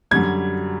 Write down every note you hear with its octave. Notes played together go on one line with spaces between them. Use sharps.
F#2 D3 G3 G#6